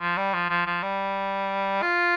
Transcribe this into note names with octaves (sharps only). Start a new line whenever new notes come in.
F3
G3
F3
F3
F3
G3
F4